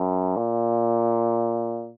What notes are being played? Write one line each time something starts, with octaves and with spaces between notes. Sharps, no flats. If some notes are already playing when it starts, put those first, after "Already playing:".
Already playing: F#2
A#2